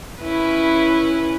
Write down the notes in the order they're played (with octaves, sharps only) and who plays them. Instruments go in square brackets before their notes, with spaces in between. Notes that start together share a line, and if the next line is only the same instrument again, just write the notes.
[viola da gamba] C#4 E4 B4